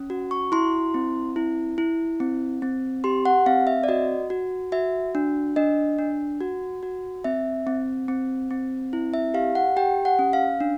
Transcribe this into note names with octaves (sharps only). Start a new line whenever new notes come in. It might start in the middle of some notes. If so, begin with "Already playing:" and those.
Already playing: C#4
F#4
C#6
E4 C6
C4
E4
E4
C4
C4
G4 C6
F#5
C4 F5
E5
D5
F#4 D#5
F#4
F#4 E5
D4
D4 D#5
D4
F#4
F#4
C4 E5
C4
C4
C4
E4
E5
G4 F5
F#5
G4 G5
F#5
C#4
F5
D4